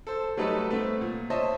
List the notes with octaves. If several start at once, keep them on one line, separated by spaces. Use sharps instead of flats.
A4 C5
F#3 G3 A3 D#4 A4 B4
A3 B3 C4
A#2
C5 C#5 D#5 E5 A5